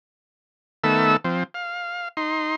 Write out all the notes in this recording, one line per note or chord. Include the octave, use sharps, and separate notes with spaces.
D#3 A3 B3 A4 E5 E6
F3 C4
F5
D#4 C6